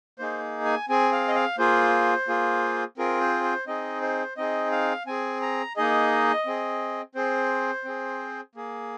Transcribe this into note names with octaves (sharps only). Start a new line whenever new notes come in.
A#3 D#4 G#4 C5
G#5
C4 G#4 G#5
F5
D#5
F5
A#3 F4 G#4 C5
A#3 F4 G#4
C4 F4 G#4 A#4
C5
C5
C4 D#4 G#4 D#5
C5
C4 D#4 G#4 D#5
F5
C4 G#4 G#5
A#5
A#3 D#4 G#4 D#5
C4 G#4
C4 G#4 C5
C4 G#4
A#3 G#4